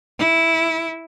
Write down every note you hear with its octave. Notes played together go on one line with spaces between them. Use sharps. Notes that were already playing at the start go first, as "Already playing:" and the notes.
E4